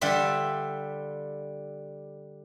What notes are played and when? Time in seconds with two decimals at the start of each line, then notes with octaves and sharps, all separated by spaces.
0.01 D3 G3 F4 E5